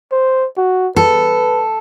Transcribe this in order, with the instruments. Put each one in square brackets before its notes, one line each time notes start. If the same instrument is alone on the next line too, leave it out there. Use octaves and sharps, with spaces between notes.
[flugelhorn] C5
F#4
[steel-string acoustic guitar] A4 [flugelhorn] B4